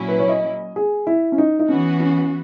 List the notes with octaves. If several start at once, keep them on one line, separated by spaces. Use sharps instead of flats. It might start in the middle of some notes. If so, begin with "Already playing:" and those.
Already playing: A#2 F#3 C#4 E4
B4
C#5
D#5
G#4
E4
C#4
D#4
D#4
E3 B3 C#4 F#4
C#4